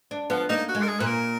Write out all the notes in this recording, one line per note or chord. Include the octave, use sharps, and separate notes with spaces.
D4
F3 B3
A#3 D#4
F#4
G#3
A#4
G#4
A#2 B4
A#4